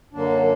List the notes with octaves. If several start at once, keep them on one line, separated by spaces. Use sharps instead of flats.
F#2 D3 F#3 A#3 D4